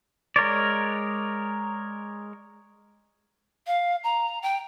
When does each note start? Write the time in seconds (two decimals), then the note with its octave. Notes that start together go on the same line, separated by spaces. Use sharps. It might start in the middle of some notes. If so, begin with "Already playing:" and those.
0.36 G#3 A#4 C#5 D5
3.67 F5
4.04 A#5
4.43 G5